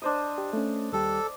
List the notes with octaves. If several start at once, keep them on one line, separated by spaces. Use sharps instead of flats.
D4 C5 D#5
G4
A3 C#4
D#2 G3 G4 A4